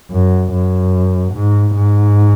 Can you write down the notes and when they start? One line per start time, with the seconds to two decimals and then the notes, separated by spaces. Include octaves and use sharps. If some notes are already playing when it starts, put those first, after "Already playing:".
0.11 F#2
0.51 F#2
1.33 G#2
1.74 G#2